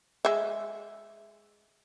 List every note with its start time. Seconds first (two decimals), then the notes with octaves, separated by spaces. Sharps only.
0.25 G#3 E5